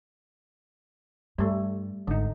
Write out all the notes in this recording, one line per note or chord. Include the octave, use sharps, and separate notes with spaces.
G2 G3 A3
G#1 D3 D#4